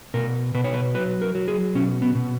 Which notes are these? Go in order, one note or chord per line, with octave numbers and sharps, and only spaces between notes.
B2 A#4
B2 B4
C#5
B4
F#3 B4
A#4
F#3
G#4
B2 C#4
B3
B2